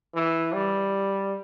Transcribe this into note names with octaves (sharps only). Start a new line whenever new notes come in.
E3
G3